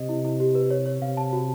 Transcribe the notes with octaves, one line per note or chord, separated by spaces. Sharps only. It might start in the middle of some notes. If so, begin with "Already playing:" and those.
Already playing: C3 D#5
E4
E4
G4
B4
C#5
C#5
C3 F5
A5
F#4